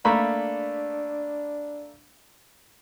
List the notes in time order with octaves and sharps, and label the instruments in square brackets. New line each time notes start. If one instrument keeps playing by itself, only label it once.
[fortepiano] A3 A#3 B5 [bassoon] D4